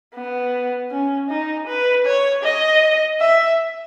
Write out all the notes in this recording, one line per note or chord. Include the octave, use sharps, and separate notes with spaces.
B3
C#4
D#4
B4
C#5
D#5
E5